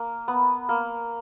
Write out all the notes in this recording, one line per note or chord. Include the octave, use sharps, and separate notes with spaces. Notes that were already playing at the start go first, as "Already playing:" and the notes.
Already playing: A#3
B3
A#3